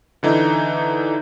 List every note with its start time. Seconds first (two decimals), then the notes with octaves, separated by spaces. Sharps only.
0.23 D3 E3 D#4